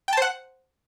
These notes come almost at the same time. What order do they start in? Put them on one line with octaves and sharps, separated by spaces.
G5 A5 C5 F#5